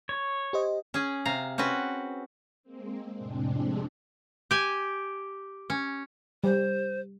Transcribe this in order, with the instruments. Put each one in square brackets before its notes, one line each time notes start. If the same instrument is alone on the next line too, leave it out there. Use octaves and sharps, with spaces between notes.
[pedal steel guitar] C#5
[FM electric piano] G4 C5 D#5
[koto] C#4 G#4
C3 F5 A#5
C4 C#4 F#4 B4
[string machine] G#3 A#3 C4
F2 A2 C3 G#3 C4 D4
[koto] G4 G#5
C#4
[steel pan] G3 [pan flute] C5